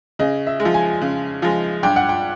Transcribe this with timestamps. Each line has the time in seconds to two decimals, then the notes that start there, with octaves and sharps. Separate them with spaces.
0.19 C#3 D#5
0.47 E5
0.60 G#3
0.65 F3
0.74 G#5
1.01 C#3
1.42 F3 G#3
1.83 G2 G5
1.96 F#5
2.09 G5